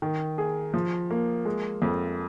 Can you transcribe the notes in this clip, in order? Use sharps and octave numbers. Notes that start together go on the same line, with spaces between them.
D#3
G#4
F3
A#3
G#3
F2